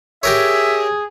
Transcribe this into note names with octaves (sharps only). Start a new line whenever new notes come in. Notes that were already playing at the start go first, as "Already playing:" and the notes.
G4 G#4 A#4 C#5 E5